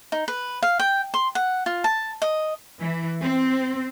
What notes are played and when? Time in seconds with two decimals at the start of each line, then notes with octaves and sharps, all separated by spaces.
0.12 D#4
0.28 B4
0.63 F5
0.79 G5
1.14 C6
1.35 F#5
1.66 F4
1.84 A5
2.22 D#5
2.80 E3
3.21 C4